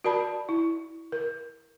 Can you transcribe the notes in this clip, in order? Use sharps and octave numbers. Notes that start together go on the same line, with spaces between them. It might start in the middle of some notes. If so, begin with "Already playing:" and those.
F#4 A#4 D5 A5 B5
E4
A#4